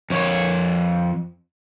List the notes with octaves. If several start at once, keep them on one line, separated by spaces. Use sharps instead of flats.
F2 C#5